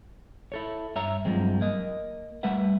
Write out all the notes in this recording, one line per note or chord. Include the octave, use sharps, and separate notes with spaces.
E4 A4 C#5
G2 C#5 E5 A#5
G2 F3 F#3 G#3 C4
A#3 D#5
G3 A3 B4 E5 F#5